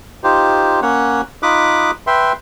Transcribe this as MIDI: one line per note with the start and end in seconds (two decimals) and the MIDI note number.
0.24 0.80 63
0.24 0.80 65
0.24 0.80 67
0.24 0.80 72
0.82 1.21 58
0.82 1.21 61
0.82 1.21 73
0.82 1.21 78
1.43 1.91 63
1.43 1.91 65
1.43 1.91 83
1.43 1.91 86
1.43 1.91 87
1.43 1.91 90
2.07 2.33 71
2.07 2.33 76
2.07 2.33 79
2.07 2.33 84